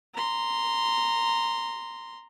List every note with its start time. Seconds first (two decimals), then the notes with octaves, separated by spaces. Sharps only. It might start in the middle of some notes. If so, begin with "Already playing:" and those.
0.14 A#5 C6